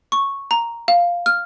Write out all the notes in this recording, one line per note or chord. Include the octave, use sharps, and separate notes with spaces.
C#6
A#5
F5
F6